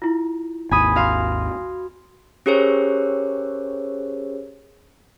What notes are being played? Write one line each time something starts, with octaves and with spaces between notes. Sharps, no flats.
E4 F4
G#1 D#2 G#5 B5 D#6
F#4 F5 C6
C#4 G4 G#4 A#4 C5 C#5